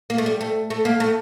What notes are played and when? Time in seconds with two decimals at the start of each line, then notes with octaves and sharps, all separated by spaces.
0.10 A#3
0.18 A3
0.26 G3
0.41 A3
0.70 A3
0.85 A#3
1.00 A3